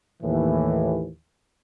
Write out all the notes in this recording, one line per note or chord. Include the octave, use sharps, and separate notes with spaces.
D#2 A2 E3